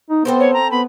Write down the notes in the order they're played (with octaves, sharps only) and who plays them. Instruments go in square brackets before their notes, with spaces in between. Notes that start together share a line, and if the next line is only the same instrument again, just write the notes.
[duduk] D#4
[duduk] B3 [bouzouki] C4 A4 C5
[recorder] C#5
A#5
[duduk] B3 [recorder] B5